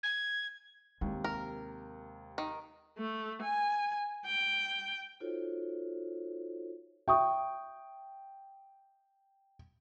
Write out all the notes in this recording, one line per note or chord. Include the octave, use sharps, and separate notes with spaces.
G#6
D#2 C3 G#3
A#4
D#3
A3
G#5
G5
D#4 F4 F#4 A4 C5 C#5
E5 G5 C#6 D#6